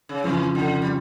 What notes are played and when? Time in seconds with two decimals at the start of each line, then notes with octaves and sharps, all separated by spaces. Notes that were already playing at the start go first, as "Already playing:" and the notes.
0.09 C#3
0.24 F2 C#3 E3 F3
0.55 D3
0.82 G3